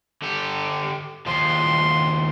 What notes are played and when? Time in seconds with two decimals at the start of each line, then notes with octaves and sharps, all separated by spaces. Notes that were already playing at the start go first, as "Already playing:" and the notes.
0.22 D3 G4
1.26 D#2 F3 C6